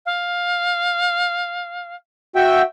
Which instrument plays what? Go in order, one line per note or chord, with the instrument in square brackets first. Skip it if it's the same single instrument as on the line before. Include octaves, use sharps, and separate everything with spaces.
[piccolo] F5
[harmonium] F#4 E5 G5